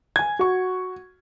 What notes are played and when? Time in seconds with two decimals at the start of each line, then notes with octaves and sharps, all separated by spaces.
0.16 G#5 G#6
0.39 F#4 C#6